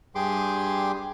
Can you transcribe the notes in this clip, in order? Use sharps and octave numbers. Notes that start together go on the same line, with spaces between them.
G2 G3 G4 G#4 C6 D6